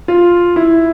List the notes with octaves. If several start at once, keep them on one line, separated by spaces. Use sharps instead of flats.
F4
E4